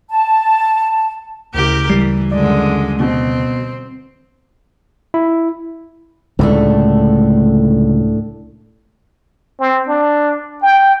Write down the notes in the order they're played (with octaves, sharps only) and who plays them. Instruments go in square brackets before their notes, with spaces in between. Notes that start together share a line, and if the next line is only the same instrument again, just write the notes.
[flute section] A5
[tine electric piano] D2 C#3 [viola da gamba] E4 G4 A#4
[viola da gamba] E3 [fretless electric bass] G3 [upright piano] C7
[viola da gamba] F#2 D3 G#3 [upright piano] D5
[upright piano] B2 [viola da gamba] C4
[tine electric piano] E4
[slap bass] C#2 D3 [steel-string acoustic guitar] A2 A3 D4
[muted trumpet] C4
D4
G5